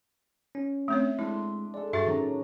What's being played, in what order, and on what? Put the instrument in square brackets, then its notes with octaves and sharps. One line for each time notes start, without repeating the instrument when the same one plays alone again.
[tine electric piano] C#4
[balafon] A3 C4 C#5 [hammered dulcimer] E5
[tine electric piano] G#3 [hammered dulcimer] D4 C6 [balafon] E4
[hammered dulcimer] G#3 A4 [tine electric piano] D5
[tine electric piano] G2 C#6 A6 [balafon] F#4 E5
[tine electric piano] A2 D#3 C#4 [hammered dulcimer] F#3 A#5